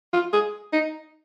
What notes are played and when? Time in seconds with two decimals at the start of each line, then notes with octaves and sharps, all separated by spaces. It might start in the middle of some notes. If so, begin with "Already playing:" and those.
0.13 F4
0.33 G#4
0.73 D#4